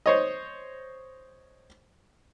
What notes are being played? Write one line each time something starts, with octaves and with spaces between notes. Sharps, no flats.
C5 C#5 D#5